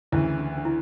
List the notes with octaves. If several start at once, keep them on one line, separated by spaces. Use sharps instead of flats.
D2 C#3 E3 E4
D4
D4
E4